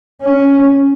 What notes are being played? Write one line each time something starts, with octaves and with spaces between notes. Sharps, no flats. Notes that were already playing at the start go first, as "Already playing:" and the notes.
C#4